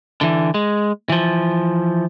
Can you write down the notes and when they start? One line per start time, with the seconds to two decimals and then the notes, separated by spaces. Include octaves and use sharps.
0.21 D3 E3
0.54 G#3
1.10 E3 F3